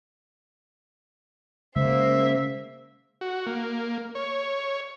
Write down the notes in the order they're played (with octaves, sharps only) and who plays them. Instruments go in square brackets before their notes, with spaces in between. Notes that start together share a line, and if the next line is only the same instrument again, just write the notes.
[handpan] C#3 G#3 [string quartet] A#3 C5 [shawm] E5
[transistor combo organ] F#4
A#3
C#5